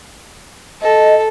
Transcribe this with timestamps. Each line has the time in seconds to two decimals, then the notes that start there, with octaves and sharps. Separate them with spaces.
0.81 A4 D#5